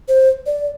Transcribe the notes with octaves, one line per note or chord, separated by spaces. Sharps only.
C5
D5